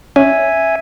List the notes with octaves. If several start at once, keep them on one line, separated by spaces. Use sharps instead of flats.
C#4 E5 G#5